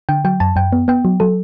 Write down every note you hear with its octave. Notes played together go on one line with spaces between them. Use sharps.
D3 G5
F#3 G5
F#2 A5
F#2 G5
B3
B3 G5
F#3
F#3 A4